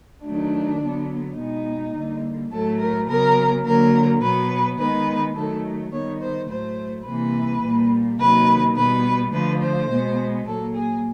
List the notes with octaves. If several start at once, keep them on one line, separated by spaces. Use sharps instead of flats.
D#3 F#3 A3 D4
D3 F#3 B3
B2 G#3 B3 D#4
D3 G3 A#3
A2 F#3 A3 A4
A#4
C#3 F#3 B3 A#4
D3 F#3 A#3 A#4
B2 F#3 B3 B4
D#3 G#3 B3 B4
D#3 F#3 A3 A4
D#3 G3 B3 C#5
C5
A2 F#3 A3 C5
C3 E3 G3 A#3 B4
A#2 G3 A#3
C3 D#3 F#3 A#3 B4
B2 G3 B3 B4
D3 F3 A3 B4
C5
B2 G#3 B3
A#2 F#3 A#3 A4
G#4